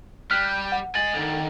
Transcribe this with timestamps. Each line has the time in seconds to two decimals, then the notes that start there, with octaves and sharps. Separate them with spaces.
0.31 G3 F6 F#6 B6
0.44 G6
0.72 F#5
0.95 D#5 G#5 A6 F#7
1.14 D3 D#3